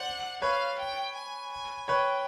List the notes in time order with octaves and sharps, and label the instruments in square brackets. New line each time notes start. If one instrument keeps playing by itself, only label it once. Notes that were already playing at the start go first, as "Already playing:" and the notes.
Already playing: [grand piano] C5 D5 [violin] F#5
[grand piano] B4 C#5 [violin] F5
[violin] G5
G#5
G#5
[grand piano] B4 C#5 [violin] G5